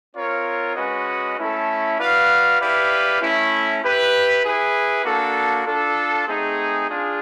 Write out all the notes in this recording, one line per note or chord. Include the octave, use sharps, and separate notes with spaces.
C4 F4 A#4 C#5
G#3 C#4 F#4 B4 D#5
A3 C#4 E4 A4
F#4 B4 D5 F5
E4 G4 B4 D5 F5
A3 C#4 E4
E4 G4 B4
E4 G#4 B4
A#3 D4 F#4 A4
D4 F4 A4
A3 C4 D#4 G#4
D4 F4 G#4